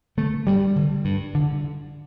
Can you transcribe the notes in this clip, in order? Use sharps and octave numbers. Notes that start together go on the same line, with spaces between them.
D3 A3
G2 G3
D3
G2
D3